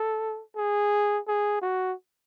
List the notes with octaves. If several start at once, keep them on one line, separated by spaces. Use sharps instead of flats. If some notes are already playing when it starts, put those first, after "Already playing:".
Already playing: A4
G#4
G#4
F#4